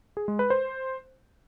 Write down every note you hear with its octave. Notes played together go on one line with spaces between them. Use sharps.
G#4
G#3
B4
C5